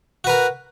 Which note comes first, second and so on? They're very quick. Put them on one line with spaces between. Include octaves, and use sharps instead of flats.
F#4 B4 A#4